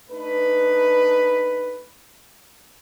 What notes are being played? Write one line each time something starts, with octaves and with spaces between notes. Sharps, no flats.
A3 D4 D#4 B4